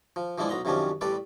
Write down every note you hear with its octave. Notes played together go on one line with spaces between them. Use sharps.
F3
E3 F3 G#3 D4 E4
B1 B3 A#5 C6
F#2 C3 D#3 F3 C#4 D4
A1 G3 A4 B4 D5